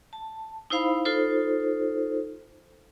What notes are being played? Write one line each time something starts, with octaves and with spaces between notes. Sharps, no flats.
A5
D#4 E4 C5 F5 B5
D#4 F4 A4 C5